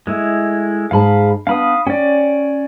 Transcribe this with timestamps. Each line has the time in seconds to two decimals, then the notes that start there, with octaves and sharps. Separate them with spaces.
0.07 G#3 A3 E4
0.91 G#2 G#3 F5 A5 B5
1.47 B3 D4 F5 B5 D#6
1.87 C#4 D5 G5